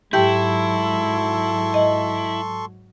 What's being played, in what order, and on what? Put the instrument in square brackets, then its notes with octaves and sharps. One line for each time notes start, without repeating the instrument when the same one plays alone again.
[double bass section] G#2 F#3 [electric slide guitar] E4 [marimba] G4 G5 [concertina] A4 C6 C#6
[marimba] D#5